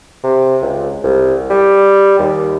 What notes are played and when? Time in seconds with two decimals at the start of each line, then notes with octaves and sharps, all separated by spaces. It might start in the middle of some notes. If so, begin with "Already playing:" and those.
0.24 C3
0.62 C#2
1.04 C2
1.50 G3
2.19 D#2